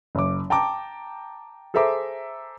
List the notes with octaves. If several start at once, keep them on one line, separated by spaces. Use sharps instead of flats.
F#1 D6
G5 A5 A#5 D6
G#4 A4 C5 E5 A#5 D6